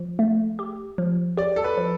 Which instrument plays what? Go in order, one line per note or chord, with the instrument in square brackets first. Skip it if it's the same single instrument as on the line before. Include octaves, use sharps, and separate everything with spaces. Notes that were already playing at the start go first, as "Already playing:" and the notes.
Already playing: [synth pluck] F3
A3
G4
F3
[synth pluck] G4 [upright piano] D5
[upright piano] A4
B4
[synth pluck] F3